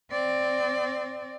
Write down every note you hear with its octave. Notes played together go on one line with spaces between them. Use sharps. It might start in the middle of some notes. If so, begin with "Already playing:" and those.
C4 D5